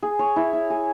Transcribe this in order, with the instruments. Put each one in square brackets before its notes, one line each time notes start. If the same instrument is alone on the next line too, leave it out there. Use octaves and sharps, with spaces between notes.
[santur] G#4
C#5
E4
E4
G#4